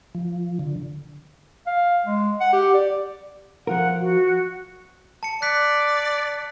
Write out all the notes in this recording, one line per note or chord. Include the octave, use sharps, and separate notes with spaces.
F3
D3
F5
G#3
F#5
G4
D5
F3 F4 A#4 F#5
F#4
A5 C#7
D5 F#6 B6